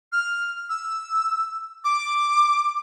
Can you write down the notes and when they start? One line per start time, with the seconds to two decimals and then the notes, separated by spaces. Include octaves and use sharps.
0.13 F6
0.69 E6
1.84 D6